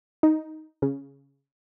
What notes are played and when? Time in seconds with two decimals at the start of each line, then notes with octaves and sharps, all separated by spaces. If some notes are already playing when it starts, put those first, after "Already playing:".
0.23 D#4
0.82 C#3